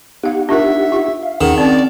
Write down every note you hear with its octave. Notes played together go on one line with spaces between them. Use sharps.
B3 D#4 G4 F5 F#5
D4 F4 A#4 E5
F4
E5 F5
D#2 D#3 C#4 G#4 F#5
C4 C#4 D5 F#5